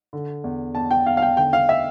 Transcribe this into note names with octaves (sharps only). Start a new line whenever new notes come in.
D3
E2
E2 A5
G5
E2 F5
F5
G5
D3 G5
F5
E5